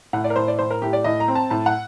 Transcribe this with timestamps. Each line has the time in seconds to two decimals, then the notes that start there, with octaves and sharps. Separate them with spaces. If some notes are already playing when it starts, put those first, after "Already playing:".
0.13 A2 F#5
0.24 D5
0.30 A#4
0.36 A2 C5
0.48 D5
0.59 A2 C5
0.71 A#4
0.82 A2 G4
0.93 D5
1.04 A2 D#5
1.20 A#5
1.28 C4
1.35 A5
1.50 A2 A5
1.66 F#5